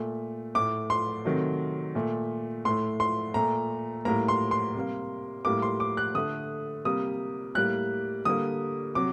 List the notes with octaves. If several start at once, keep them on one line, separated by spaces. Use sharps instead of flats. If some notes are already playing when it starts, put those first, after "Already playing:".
Already playing: A#2 A3
A2 A3 D6
C6
C3 D#3 F#3 A3
A#2 A3
A2 A3 C6
C6
A#2 A3 A#5
A2 G3 A#3 A#5
C6
C6
C3 G3 A#3
A2 G3 A#3 D6
C6
D6
F#6
D3 A3 D#6
C3 G3 A#3 D#6
A2 G3 A#3 F#6
D3 G3 A#3 D#6
C3 F#3 D6